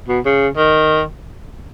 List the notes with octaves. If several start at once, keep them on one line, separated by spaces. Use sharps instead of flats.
B2
C#3
D#3